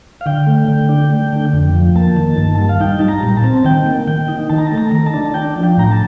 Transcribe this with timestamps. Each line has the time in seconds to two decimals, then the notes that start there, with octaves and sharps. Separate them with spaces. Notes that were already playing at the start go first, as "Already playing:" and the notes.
0.21 F5
0.26 D3 G5
0.47 A3
0.68 D3
0.89 D4
1.11 A3
1.33 D3
1.53 F2
1.75 F3
1.95 A#3 A5
2.17 D#3
2.37 G2
2.59 G3
2.69 F5
2.80 D#4 G5
2.99 G3 A5
3.08 A#5
3.23 A#2
3.37 A5
3.44 C4
3.65 D#3 G5
3.86 A#3
4.07 D#3 G5
4.28 D#4
4.49 D#3 A5
4.58 A#5
4.67 A5
4.72 A3
4.78 A#5
4.92 D#3 A#5
5.06 A5
5.14 D4
5.34 D4 G5
5.56 F3
5.63 G5
5.77 A2 A#5
5.91 A5